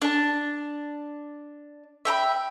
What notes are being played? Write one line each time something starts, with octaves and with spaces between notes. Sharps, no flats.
D4 A5
E5 G5 A#5 B5